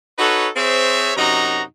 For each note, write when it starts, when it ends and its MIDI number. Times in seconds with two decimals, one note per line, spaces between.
0.19 0.47 63
0.19 0.47 66
0.19 0.47 69
0.19 0.47 71
0.19 0.47 73
0.56 1.12 60
0.56 1.12 68
0.56 1.12 72
0.56 1.12 73
0.56 1.12 76
1.16 1.62 42
1.16 1.62 48
1.16 1.62 63
1.16 1.62 66
1.16 1.62 82